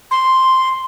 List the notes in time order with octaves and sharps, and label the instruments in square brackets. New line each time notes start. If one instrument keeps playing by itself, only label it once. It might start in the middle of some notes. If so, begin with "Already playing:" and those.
[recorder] C6